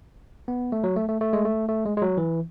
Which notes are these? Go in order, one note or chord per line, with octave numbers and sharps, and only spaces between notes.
B3
A3
F#3
A3
A3
A3
G#3
A3
A3
G#3
G#3
F#3
E3